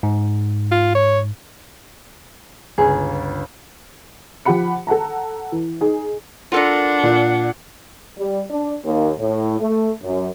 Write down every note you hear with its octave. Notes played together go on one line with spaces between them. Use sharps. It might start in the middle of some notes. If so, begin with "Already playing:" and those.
G#2
F4
C#5
G1 C#2 G#4
F3 F4 G4 F#5 B5 C#7
A4 F#5 A5 A#5
E3
D#4 G#4 G#5
D4 F4 A4 A#4 F#5
A#2
G3
D4
D#2
A2
A3
F#2